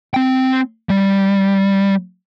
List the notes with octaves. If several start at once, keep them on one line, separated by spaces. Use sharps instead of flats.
C4 G5
G3